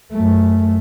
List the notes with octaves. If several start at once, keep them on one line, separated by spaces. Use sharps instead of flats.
F#2 A3